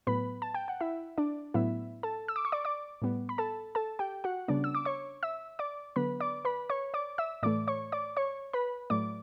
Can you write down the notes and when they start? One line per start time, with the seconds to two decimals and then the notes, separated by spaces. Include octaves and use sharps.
0.07 A2 F#3 B3 B4 B5
0.42 A5
0.54 G5
0.68 F#5
0.81 E4 E5
1.18 D4 D5
1.54 A2 F#3 B3 E4 E5
2.03 A4 A5
2.28 E6
2.36 D6
2.45 C#6
2.52 D5 D6
2.65 D5 D6
3.02 A2 G3 B3
3.29 B5
3.38 A4 A5
3.75 A4 A5
3.99 G4 G5
4.24 F#4 F#5
4.48 C#3 G3 B3 D4 D5
4.64 E6
4.75 D6
4.85 C#5 C#6
5.23 E5 E6
5.59 D5 D6
5.96 D3 F#3 B3 B4 B5
6.21 D5 D6
6.45 B4 B5
6.70 C#5 C#6
6.94 D5 D6
7.18 E5 E6
7.43 A2 E3 A3 D5 D6
7.68 C#5 C#6
7.92 D5 D6
8.17 C#5 C#6
8.53 B4 B5
8.90 A2 F#3 A3 D5 D6